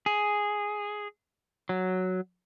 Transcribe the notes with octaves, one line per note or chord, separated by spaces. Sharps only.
G#4
F#3